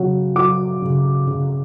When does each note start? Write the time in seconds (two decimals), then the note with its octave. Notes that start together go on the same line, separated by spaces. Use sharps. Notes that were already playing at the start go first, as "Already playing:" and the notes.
Already playing: C#3 F#3
0.36 F#3 D6
0.82 C#3
1.27 C#3